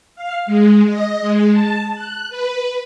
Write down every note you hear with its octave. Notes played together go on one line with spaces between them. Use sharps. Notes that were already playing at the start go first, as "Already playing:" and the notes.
F5
G#3
D#5
G#3
A5
F#6
B4